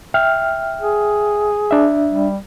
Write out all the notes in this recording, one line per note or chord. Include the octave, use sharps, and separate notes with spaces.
E5 G5 F6
G#4
D4 E5
G3